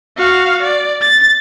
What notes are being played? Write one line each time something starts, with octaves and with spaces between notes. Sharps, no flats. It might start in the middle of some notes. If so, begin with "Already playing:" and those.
F#4 F5
D5
A6